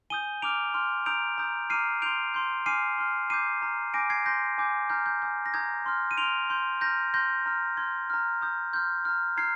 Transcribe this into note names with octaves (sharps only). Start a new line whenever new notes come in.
G#5 D#6 G6 D#7 G7
A#5 D6 F6 D7 F7
C6 F6
A#5 D#6 G6 D7 F7
A#5 D#6 G6
A#5 D6 F6 C7 D#7
C6 G6 D7 F7
C6 G6
G#5 D6 F6 C7 D#7
C6 F6
A#5 D6 G6 C7 D#7
A#5 F6
G#5 D6 G6 A#6 D7
G#6 C7
C6 G6 A#6
G#5 D6 G6
A#5 F6 G6
G6
G#5 D#6 G6
A#6
A#5 D#6 G6 G#6
C6 F6
D#7
C6 F6 D7 F7
C6 G6
A#5 F6 G6 A#6
C6 F6 G6 A#6
A#5 F6
C6 F6 G#6
A#5 F6
A#5 D#6 G6
C6 F6 G6
A#5 F6
A#5 F6 G#6 C7